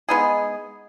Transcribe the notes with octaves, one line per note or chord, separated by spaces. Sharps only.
G#3 B3 D#4 G#4